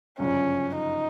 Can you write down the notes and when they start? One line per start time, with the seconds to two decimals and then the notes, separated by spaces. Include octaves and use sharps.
0.19 G1 F#2 C#3 F3 C#4
0.75 D#4